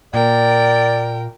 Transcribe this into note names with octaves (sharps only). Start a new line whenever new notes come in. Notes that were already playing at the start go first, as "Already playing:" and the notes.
A#2 A#4 D5 G5